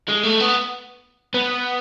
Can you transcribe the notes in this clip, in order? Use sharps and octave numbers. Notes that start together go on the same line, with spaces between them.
G#3
A3
B3
B3